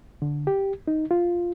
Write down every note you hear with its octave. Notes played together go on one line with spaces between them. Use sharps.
D3
G4
D#4
F4